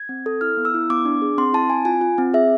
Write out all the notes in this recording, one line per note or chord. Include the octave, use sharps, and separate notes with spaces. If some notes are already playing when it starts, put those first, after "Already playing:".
Already playing: G#6
C4
A4
E4 F6
B3
E6
E4
B3 D6
D4
G#4
C4 C6
E4 A5
C4 G#5
F4 G#5
F4
C4
G#4 E5